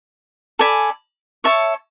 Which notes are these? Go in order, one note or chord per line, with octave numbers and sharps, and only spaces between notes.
A4 D5 G#5 B5
C#5 E5 A5 C#6